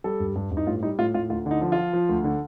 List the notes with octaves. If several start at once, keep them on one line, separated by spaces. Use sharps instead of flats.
G3 A4
G2
G2
G2
D#4
A2 F4
G3 D#4
A2 F4
A2 F4
D2 F4
D3 D#4
F3
F4
F3
F3
D2
D3